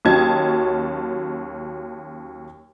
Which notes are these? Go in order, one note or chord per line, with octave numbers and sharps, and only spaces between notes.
D#2 F#3 C#4 D#5 A5 G#6